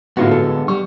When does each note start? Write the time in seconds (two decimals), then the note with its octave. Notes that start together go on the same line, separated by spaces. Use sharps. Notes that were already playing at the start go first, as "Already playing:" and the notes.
0.17 A2 D3 G#3 B3 F4 F#4
0.31 A4
0.68 G3 C#6